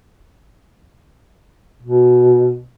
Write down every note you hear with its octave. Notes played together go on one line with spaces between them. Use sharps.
B2